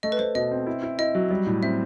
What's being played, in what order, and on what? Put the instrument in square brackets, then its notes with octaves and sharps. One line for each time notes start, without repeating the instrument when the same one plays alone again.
[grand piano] A3 [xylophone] D#5
[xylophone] B4
[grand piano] A3 [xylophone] C5
[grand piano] B2 [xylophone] D#5
[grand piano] C4
E4
E4
[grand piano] E4 [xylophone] D#5
[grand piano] F#3
G3
A2
[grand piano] C4 [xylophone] E5